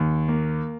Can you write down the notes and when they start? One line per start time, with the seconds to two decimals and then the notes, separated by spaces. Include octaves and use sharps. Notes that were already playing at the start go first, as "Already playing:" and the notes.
Already playing: D#2
0.28 A#3